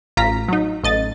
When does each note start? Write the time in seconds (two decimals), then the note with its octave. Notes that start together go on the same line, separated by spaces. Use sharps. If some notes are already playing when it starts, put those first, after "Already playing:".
0.17 A1 F4 A#5 B6
0.49 F#3 D#4
0.84 A1 D#5 A6